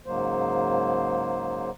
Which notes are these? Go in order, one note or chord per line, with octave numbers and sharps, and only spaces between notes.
G#2 C#3 F#3 A#3 C5